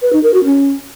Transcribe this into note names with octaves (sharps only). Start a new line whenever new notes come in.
B4
D#4
A#4
F#4
C#4